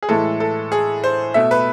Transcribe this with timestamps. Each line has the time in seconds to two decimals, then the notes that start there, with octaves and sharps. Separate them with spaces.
0.03 G#4
0.09 A2 E3 G#3 A4
0.40 A4
0.72 G#4
1.04 C5
1.34 B2 A3 E5
1.51 B4